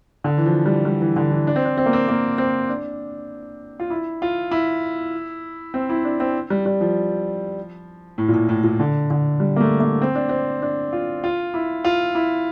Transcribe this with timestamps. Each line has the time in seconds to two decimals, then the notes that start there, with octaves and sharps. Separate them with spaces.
0.24 D3
0.38 E3
0.46 F3
0.66 G3
0.85 G3
1.01 E3
1.16 D3
1.32 E3
1.47 D4
1.56 C4
1.65 D4
1.77 C4
1.86 A#3
1.93 C4
2.08 A#3
2.38 C4
2.69 D4
3.80 F4
3.90 E4
4.22 F4
4.51 E4
5.74 C4
5.90 E4
6.04 D4
6.20 C4
6.50 G3
6.66 G3
6.81 F3
8.18 A2
8.28 A#2
8.34 A2
8.49 A2
8.63 A#2
8.80 D3
9.10 D3
9.40 G3
9.56 A#3
9.60 A3
9.80 A#3
10.02 C4
10.15 D4
10.29 C4
10.62 D4
10.93 F4
11.24 F4
11.54 E4
11.84 F4
12.15 E4